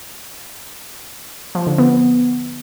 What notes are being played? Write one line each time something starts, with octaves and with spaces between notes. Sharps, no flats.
F3
D3
B3